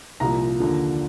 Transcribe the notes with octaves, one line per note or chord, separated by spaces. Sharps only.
C2 A#2 F3 A#5
D#2 D3 F3